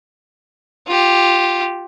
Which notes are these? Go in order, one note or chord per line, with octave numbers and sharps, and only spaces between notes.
F4 G4